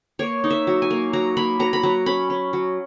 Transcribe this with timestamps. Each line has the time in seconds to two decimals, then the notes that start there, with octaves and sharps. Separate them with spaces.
0.19 A#3 C#5
0.44 D#4
0.51 E5
0.67 F#3
0.82 G#5
0.91 A#3
1.13 F#3 A#5
1.37 A#3 B5
1.60 F#3 A#5
1.73 B5
1.83 F#3 A#5
2.06 C#4 B5
2.30 C#4
2.53 F#3